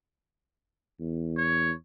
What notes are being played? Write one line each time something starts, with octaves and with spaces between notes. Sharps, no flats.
E2
C#5